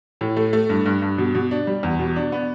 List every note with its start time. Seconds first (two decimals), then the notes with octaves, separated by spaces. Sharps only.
0.21 A2
0.36 A3
0.53 A3
0.69 G2
0.86 G2
1.02 G2
1.18 B2
1.34 B2
1.51 D4
1.67 G3
1.83 E2
1.99 B2
2.16 D4
2.32 B3